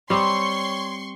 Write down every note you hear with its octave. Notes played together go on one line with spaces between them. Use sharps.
G3 C4 C#5 C6 C#6